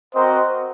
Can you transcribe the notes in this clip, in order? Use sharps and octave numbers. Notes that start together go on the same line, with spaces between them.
C4 F#4 A#4 C5 D#5